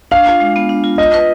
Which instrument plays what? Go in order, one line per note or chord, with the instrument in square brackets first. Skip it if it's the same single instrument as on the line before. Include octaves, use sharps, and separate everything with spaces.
[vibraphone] D4 [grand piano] F5
[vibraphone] F4
G#3
B3
D4
F4
[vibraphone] F4 [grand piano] D#5
[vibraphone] B4